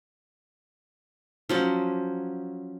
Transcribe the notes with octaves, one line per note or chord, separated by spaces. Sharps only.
F3 F#3 C#4